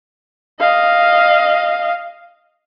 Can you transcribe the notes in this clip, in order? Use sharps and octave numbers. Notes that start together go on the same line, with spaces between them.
D#5 F5